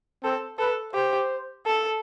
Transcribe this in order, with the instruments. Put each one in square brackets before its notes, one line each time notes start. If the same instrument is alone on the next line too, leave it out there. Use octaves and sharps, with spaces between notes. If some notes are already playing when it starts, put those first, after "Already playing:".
[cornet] C4 [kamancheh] A4
[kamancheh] A4 [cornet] B4
[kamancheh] G4 [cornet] C5
[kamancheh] A4